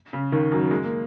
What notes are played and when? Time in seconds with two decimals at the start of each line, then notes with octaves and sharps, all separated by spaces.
0.13 C#3
0.32 D#2 D#3
0.52 F#2 F#3
0.71 G#3
0.83 A#3